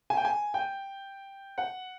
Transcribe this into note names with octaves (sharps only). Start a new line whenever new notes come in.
G#5
G5
G#5
G5
F#5